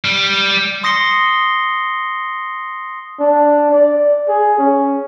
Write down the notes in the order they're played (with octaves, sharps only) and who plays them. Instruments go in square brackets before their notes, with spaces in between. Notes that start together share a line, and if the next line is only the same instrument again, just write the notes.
[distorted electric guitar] G3
[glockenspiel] C6 D#6 A#6 C7 C#7 G7
[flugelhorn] D4
D5
G#4
C#4